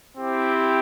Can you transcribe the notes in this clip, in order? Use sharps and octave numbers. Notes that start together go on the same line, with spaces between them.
C4 E4 G4